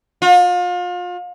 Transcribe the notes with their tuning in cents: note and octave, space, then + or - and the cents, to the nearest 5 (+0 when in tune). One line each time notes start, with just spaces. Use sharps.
F4 +35